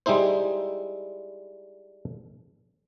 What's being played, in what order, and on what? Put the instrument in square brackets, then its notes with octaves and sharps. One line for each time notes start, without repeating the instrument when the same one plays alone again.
[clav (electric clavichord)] G3 G#3 D#4 E4 C5